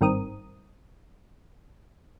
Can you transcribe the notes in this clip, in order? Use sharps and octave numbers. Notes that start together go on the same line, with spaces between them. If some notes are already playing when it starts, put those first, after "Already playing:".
G#1 G2 D#3 C4 A#4 D#6